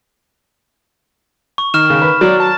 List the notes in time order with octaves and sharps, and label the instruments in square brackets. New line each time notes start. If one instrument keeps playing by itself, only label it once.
[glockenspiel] C#6
[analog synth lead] D#3 [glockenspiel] C#6 F6 E7
[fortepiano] C#3
B4
[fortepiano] F#3 [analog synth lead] D5
[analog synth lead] A5